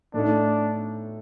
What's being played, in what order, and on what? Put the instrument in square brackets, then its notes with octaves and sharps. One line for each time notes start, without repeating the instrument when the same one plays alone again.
[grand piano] A2 A3 D#4 [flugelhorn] D4